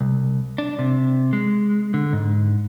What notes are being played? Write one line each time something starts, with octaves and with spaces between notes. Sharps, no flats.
C2
D4
C3
G#3
D3
G#2